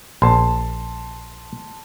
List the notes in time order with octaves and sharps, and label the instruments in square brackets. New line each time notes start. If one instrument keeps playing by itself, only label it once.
[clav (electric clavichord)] A#1 [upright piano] A5 C6